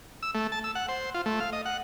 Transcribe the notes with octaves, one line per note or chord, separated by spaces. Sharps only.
E6
A3
A5
E6
F#5
C5
F4
A3
F5
D#5
F#5